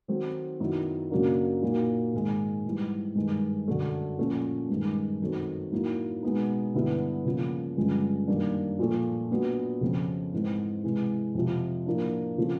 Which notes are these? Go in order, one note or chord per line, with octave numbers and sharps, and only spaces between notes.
D#3 F#3 A3 C4 D#4
F#2 D#3 F#3 B3 E4
F#2 C#3 F#3 A#3 D4
A#2 F#3 A#3 D#4
G#2 D#3 G#3
G#2 E3 G3
G2 D#3 G#3
F#2 D3 F#3 A3
A#2 F3 A3 C#4
G2 D#3 G#3
F#2 D#3 F#3 A3 C4
A2 F#3 A#3 D#4
B2 G#3 B3 D#4
G2 D3 G3 B3 E4
C#3 F3 A#3
G2 D3 F3 G#3 C#4
F#2 D#3 G3 A#3 D4
A#2 F3 A3
A#2 F#3 B3 D4
F2 C#3 F#3 A3 C4
G#2 E3 A3 C4
C3 E3 G#3
F2 C3 F3
A2 F3 A#3 D4
C#3 F3 A3 C4